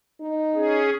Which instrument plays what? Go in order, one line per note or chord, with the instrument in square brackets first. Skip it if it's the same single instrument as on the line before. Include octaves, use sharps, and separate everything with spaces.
[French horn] D#4
[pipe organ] C#4 G#4